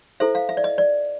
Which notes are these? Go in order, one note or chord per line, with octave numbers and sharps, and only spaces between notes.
E4 A4 C5 E5
F5
E5
D5
D#5
D5